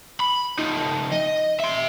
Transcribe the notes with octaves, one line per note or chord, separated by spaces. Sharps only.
B5
F3 D#4
D#5
E5 C6